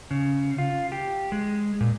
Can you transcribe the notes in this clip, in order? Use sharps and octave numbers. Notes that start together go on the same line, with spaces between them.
C#3
F4
G4
G#3
A#2